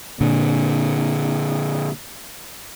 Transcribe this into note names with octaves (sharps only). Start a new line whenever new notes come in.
A#2 D3